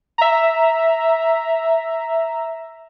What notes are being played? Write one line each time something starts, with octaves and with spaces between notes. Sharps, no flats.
E5 A#5